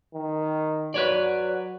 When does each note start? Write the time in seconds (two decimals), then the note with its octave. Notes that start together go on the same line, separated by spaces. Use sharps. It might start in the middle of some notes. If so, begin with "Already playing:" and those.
0.13 D#3
0.94 F#3 B4 C#5 D5